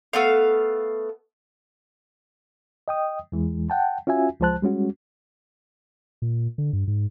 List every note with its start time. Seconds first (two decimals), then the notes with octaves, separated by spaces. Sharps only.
0.13 A3 B3 F5
2.88 D#5 G5 D#6
3.32 E2 E3 G#3
3.70 F#5 G5 A5
4.07 C#4 F4 F#4 E5 G#5
4.40 C#2 F3 G#3 C5 A5 F#6
4.62 G3 G#3 C#4 F#4
6.22 A#2
6.58 D3
6.73 G2
6.87 G#2